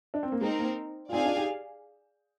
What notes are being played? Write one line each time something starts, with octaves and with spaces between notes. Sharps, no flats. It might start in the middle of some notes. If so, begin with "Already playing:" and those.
D4
C4
A#3
G#3 C4 D#4 A#4
A#3
F4
C4 D#4 G#4 D5 F5 G#5
D4 F4
D#4 G4